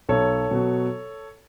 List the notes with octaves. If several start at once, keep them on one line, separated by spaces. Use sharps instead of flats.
B1 A4 C#5
B2 F#3